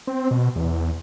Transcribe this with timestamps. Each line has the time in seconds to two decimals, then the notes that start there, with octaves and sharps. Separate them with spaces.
0.07 C4
0.31 B2
0.56 E2